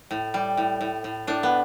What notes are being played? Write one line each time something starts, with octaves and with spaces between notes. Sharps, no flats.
A2
G3
A2
A2
A2
A2 D4
B3